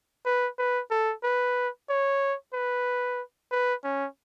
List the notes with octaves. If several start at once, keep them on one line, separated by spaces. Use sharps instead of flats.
B4
B4
A4
B4
C#5
B4
B4
C#4